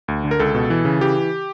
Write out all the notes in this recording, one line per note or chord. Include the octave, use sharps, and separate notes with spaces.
D2
D3
A#4
C#2 A4
B2
E3
C#3
E3 G4